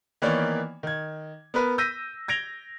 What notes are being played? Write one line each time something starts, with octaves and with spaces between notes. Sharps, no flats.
D#3 E3 A#3 B3 C#5 D5
D#3 G#6
B3 A#4 B4
E6 G6 A#6 B6 D#7
G#6 A#6 D7 F7 G7